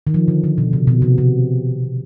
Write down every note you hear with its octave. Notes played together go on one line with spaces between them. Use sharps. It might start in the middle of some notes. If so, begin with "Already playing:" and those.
D#3
F3
D3
D3
B2
C3
B2
C3
C3